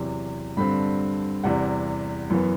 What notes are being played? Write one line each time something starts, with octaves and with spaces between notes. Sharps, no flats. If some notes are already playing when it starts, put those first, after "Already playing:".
Already playing: E2 C3 F#3
G2 D3 G3 C4 B5
E2 C3 G3 F#5
F#2 E3 B3